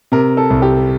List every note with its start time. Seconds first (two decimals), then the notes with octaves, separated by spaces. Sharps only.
0.12 C3 A#4
0.37 A4
0.50 C2
0.62 G4